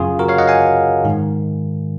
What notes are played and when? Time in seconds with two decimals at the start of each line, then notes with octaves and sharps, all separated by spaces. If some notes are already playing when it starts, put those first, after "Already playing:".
Already playing: F#2 C#3 F4 G#4
0.19 F#4 A#4
0.28 C#5 F5
0.38 D#5 F#5
0.47 F5 G#5
1.05 G#2 D#3